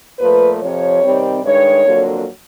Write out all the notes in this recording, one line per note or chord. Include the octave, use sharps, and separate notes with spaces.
A#2 F3 A3 B4
F2 C3 F3 C#5
C3 D#3 G3 C4
G2 D#3 G#3 C#5
F2 D3 F#3 A#3